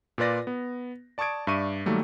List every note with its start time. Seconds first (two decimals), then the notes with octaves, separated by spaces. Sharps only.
0.18 A#2 F4 B4 D5 A#6
0.47 B3
1.18 D5 A5 C#6 D#6 G#6 D7
1.47 G2 D5 E5 C#6 D#7
1.86 D#3 F#3 G3 A3 A#3